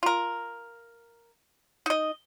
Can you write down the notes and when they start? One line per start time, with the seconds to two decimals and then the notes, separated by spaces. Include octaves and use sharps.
0.03 F4 A#4
1.86 D#4 D#5